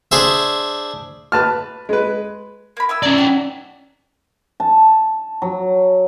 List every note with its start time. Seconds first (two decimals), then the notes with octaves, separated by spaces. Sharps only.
0.11 D4 G#4 C5 E5
1.32 B4 A5 F6
1.89 G#3 B4
2.77 A#3 B5
2.89 E4 D#6 E6
3.03 C#4 D5 G#5 A#5
3.18 F#4 G4
4.60 A5
5.42 F#3